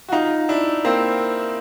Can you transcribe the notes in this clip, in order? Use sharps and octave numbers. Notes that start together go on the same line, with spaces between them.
F#4
D#4 F4
D4 E4
A#3 C4